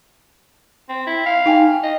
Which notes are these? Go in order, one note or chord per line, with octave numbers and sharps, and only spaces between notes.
C4
E4
F5
D#4 G5 G#5
D#5